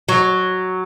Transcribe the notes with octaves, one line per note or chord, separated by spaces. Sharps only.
F#3